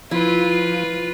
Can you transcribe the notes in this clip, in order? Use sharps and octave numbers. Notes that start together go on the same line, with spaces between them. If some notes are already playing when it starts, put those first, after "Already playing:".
F3 E4 F4 B4